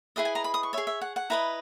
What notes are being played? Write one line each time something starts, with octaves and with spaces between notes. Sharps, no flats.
E4 G#4 B4 D#5 E5
G#5
A#5
B5
D#6
C#6
G#4 C#5 E5
E5
F#5
F#5
E4 B4 D#5 A#5